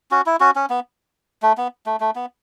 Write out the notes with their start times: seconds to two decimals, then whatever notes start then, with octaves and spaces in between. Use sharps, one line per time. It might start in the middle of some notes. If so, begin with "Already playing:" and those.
0.11 C#4 F#4
0.26 E4
0.40 C#4 F#4
0.56 C#4
0.70 B3
1.42 A3
1.57 B3
1.86 A3
2.00 A3
2.16 B3